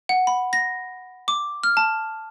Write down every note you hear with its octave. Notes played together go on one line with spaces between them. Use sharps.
F#5
B5
A#6
D6
F6
A5